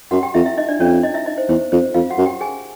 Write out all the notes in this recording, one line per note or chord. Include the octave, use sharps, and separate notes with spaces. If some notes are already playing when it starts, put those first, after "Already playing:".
F#2 F#4 F#5
G4 G5
F2 E4 E5
E4 E5
D#4 D#5
D4 D5
F2 C#4 C#5
D#4 D#5
E4 E5
D#4 D#5
C5
E2 C5
F2 C5
F2 F4 F5
F#4 F#5
F#2
G4 G5
G#4 G#5